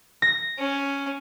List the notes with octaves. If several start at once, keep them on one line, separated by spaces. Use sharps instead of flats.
A#6
C#4